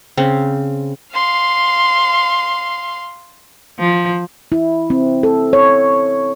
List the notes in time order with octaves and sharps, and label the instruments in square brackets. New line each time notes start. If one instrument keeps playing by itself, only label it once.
[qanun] C#3 C4
[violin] F5 C6
[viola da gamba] F3
[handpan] E4
C4
A4
C#5